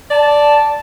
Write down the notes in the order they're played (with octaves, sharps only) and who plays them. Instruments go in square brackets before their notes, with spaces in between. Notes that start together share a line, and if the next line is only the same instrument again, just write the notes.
[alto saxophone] D5 [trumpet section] A5